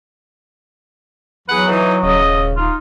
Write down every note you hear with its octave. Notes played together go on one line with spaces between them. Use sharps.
E2 F#3 G#4 B4 F#5
E3 D#4
D#1 C#3 D#5
D#4 F4